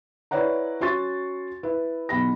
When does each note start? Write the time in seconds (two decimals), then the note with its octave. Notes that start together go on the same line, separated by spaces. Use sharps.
0.31 E4 B4 C#5 D5 F#5 A#5
0.80 C#4 F#4 C6 C#6 A6
1.63 E4 B4
2.09 B1 E2 B5 A#6